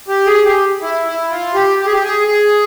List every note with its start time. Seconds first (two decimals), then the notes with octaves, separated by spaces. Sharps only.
0.08 G4
0.27 G#4
0.45 G4
0.82 E4
1.06 E4
1.31 F4
1.54 G4
1.79 G4
1.86 G#4
1.92 G4
2.03 G#4
2.28 G#4